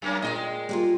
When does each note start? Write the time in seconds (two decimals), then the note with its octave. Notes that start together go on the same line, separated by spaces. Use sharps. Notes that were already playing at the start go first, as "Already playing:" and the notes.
0.02 F#2 A#3 C#4
0.22 A#2 G#3 B4 D#5 G5
0.69 G3 A#3 F4